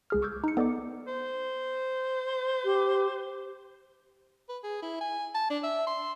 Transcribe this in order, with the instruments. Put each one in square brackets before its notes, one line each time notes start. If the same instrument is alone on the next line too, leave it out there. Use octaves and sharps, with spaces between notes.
[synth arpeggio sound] C#2 G#4 F6
C#6 D6 E6 G6 G#6
D#4 C#7
B3 A4 D5 D#5 D6
[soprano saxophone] C5
[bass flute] G4
[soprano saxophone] B4
G#4
E4
G#5
A5
D4
E5
C6